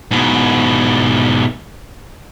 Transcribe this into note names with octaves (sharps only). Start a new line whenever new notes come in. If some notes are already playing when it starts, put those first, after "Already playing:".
G#2 B2